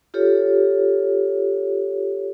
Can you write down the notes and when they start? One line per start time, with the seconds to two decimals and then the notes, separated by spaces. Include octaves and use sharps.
0.14 F4 G4 A4 C#5